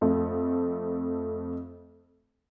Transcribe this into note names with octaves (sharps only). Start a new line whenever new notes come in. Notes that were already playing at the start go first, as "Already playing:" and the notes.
F2 A3